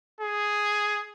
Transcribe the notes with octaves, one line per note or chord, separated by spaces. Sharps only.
G#4